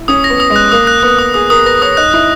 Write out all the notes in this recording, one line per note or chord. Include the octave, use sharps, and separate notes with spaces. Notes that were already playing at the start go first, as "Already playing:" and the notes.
Already playing: E4
C#4 D#6
A#6
B3
D#6
G#3
F#6
A#3 D#6
F#6
B3 F#6
D#6
G#4 D#6
A#4 D#6
B4 A#6
C#5 D#6
D#4 F#6
E4 F#6